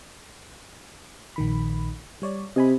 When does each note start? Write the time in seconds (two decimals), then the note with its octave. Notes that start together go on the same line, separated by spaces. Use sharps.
1.36 A#1 D#3 B5
2.22 G3 C#5 D5
2.56 C3 D#5 G#5 B5